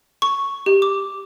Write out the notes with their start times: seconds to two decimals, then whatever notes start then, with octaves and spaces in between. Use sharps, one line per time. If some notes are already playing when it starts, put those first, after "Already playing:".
0.22 C#6
0.66 G4
0.82 D6